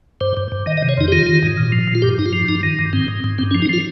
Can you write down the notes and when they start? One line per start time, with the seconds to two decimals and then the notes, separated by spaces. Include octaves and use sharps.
0.21 G2 C5
0.37 G2
0.52 G2
0.66 D#3 D#5
0.77 D#5
0.82 C3
0.89 C#5
0.97 F2 D#4
1.08 G4
1.12 D#3 F4
1.27 D#3
1.43 G#2
1.57 A#2
1.72 F3
1.87 A#2
1.95 F4
2.02 G2 G4
2.18 G2 D#4
2.26 F4
2.33 F3
2.49 G2 D#4
2.63 D#3
2.79 G2
2.93 G#2 C4
3.08 G#2
3.24 G#2
3.38 G2 C4
3.51 C#4
3.55 F3
3.62 D#4
3.69 F3 F4